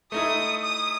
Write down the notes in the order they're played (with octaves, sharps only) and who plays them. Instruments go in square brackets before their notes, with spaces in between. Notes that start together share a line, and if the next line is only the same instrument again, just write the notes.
[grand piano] A3 D#4 E4 [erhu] D#6
[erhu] D#6